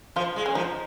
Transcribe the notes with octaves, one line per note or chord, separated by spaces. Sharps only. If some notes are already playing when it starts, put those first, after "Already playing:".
F3 F4
G#3
C#4
F3 D#4